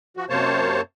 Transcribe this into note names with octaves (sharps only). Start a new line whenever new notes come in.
F3 F#4
F#2 C3 A#3 C5 C#5 A5